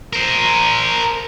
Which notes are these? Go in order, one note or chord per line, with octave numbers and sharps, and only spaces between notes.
A#4 C5